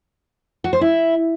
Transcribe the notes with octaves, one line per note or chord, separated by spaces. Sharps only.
F#4
C5
E4